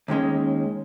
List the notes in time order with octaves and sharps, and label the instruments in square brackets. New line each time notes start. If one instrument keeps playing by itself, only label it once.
[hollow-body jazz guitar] D#2 D#3 G#3 C#4